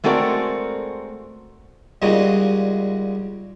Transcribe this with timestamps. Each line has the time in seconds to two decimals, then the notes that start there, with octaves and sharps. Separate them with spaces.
0.04 G#3 A3 C4 F#4 A#4 D5
2.02 A#2 C#3 G3 G#3 D#4 F#4